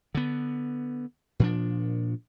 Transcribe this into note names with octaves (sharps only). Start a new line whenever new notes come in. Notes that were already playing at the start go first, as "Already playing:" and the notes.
D3 B3
A#2 F3 D4